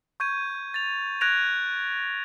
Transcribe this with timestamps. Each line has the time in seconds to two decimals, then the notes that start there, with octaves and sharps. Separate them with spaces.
0.20 C#6 G6 G#6 D#7
0.74 A6 F7
1.21 F#6 G#6 A#6 D7 F7